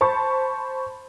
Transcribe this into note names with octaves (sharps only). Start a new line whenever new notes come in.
C5 A5 B5 C#6